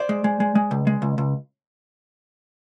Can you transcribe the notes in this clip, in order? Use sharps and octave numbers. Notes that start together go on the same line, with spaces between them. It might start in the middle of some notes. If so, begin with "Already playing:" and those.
Already playing: C5 D5
G#3
G#3
G#3
G#3
C#2
G#3
C#2
C#2